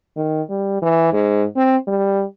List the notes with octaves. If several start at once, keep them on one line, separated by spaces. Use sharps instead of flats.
D#3
G3
E3
G#2
C4
G3